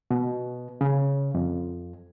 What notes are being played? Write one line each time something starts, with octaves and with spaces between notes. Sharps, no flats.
B2
C#3
F2